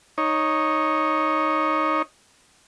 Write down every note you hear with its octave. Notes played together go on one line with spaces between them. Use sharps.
D#4 C#5